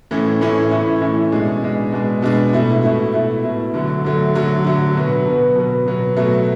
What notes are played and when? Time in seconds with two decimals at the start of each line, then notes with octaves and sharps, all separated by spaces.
0.11 A2 E3 A3 C#4 E4
0.41 A2 E3 A3 C#4 E4
0.71 A2 E3 A3 C#4 E4
1.01 A2 E3 A3 C#4 E4
1.32 B2 G#3 D4
1.62 B2 G#3 D4
1.92 B2 G#3 D4
2.22 B2 G#3 D4
2.53 B2 A3 E4
2.83 B2 A3 E4
3.13 B2 A3 E4
3.44 B2 A3 E4
3.74 D3 F#3 A3
4.04 D3 F#3 A3
4.34 D3 F#3 A3
4.65 D3 F#3 A3
4.95 B2 F#3 B3
5.26 B2 F#3 B3
5.56 B2 F#3 B3
5.86 B2 F#3 B3
6.16 B2 F#3 A3